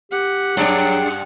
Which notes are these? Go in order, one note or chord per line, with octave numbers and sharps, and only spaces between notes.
G4 F#5
F#2 F#3 D4 G4 G#4 D5